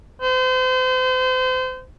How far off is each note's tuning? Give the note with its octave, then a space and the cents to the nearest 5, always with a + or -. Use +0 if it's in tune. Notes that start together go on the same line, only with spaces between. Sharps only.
C5 -35